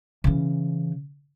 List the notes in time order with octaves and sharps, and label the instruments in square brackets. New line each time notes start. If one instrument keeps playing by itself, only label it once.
[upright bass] C#3 E3